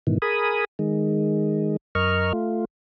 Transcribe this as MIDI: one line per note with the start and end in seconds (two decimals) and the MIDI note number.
0.07 0.18 44
0.07 0.18 47
0.07 0.18 51
0.07 0.18 52
0.22 0.65 68
0.22 0.65 70
0.22 0.65 80
0.22 0.65 83
0.22 0.65 87
0.79 1.77 51
0.79 1.77 56
1.95 2.33 42
1.95 2.33 70
1.95 2.33 75
1.95 2.33 85
1.95 2.33 89
2.33 2.65 57
2.33 2.65 65